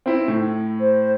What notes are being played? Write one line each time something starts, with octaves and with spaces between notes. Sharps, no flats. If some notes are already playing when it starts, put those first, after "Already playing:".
C4 E4
A2
C5